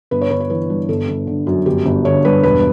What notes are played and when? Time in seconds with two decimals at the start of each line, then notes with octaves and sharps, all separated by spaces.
0.11 G1 B4
0.21 C#5
0.30 G1 B4
0.40 C#5
0.50 E3 B4
0.70 G2
0.89 G1 A4
1.08 G1
1.27 D3
1.47 F#2
1.66 G1 G4
1.86 G1
2.05 D3 C#5
2.25 G2 B4
2.43 E1 B4